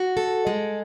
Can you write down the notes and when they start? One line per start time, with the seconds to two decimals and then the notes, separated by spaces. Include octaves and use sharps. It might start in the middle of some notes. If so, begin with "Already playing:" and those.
Already playing: F#4
0.17 A4
0.47 G#3